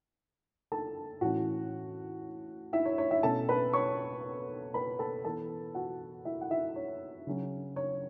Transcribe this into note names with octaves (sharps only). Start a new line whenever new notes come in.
A4 A5
A2 E3 C#4 F#4 F#5
E4 E5
C#5
C#5
E4 E5
B2 A3 C#4 A4 A5
B4 B5
C#5 C#6
B4 B5
A4 A5
E3 B3 A4 A5
F#4 F#5
E4 E5
F#5
E4 E5
C#5
C#3 F#3 C#4
C#5